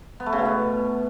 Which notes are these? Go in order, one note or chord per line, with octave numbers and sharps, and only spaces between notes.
B3
A3
C#3
B2
B3